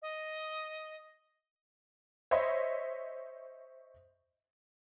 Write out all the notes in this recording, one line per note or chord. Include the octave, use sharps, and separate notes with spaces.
D#5
C5 C#5 D#5 E5 B5